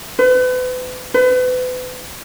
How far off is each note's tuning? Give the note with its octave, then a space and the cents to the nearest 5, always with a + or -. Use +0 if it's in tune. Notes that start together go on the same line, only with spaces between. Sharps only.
B4 +35
B4 +35